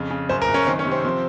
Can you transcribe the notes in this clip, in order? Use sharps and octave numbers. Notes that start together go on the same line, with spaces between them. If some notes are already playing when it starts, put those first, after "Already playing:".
Already playing: F2 C#3
C#3
F#2 C5
A#4
F#2
C#4
D#3 C4
C#4
C3
C4
F3 C4